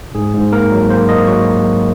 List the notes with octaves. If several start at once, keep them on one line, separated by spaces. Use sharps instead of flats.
G#2 G#4
G#2
A#3 A#4
F#3
A#3 C5
A#3 D#5
F#3 C#6